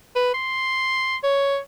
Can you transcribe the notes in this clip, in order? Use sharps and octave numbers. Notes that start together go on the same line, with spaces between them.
B4
C6
C#5